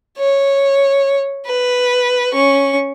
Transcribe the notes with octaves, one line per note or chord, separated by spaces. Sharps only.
C#5
B4
C#4 C#6